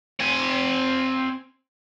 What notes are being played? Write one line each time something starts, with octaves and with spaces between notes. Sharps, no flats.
C4 G#5